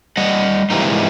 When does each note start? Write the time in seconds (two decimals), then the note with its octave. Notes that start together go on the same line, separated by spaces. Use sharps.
0.17 G3 D#5 F#5
0.70 G#2 C3 E3 G3 A#3 D#4